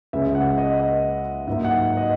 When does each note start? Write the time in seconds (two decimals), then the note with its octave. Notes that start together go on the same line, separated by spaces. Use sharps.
0.13 C#2 C#3 G#3 C#4 E5
0.35 F#5
0.58 D#5
0.80 D#5
1.47 G#2 F#3 A#3 D#4 E5
1.64 F#5
1.97 D#5